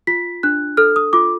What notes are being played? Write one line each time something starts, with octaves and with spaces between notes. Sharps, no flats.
F4 B6
D4 F#6
A4 F6
D#6
F4 D6